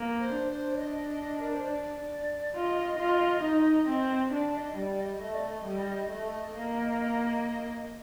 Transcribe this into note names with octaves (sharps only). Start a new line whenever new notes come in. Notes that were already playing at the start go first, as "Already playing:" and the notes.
Already playing: A#3
C5
D4
C5
D#5
A#4
C5
D5
F4 D#5
F4
D#4
C4
D4 D5
D#5
G3 D5
D#5
A3 D#5
D5
D#5
G3
A3 D#5
A#3
D#5